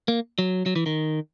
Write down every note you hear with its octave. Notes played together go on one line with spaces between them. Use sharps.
A#3
F#3
F#3
E3
D#3